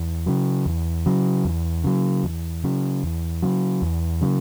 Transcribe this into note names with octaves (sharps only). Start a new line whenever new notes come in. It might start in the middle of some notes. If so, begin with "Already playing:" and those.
Already playing: E2
C#3 F#3
E2
C#3 F#3
E2
C#3 F#3
E2
C#3 F#3
E2
C#3 F#3
E2
C#3 F#3